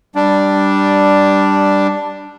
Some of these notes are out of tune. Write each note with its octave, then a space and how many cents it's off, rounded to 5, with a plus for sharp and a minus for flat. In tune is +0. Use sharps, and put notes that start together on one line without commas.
G3 +0 D4 +0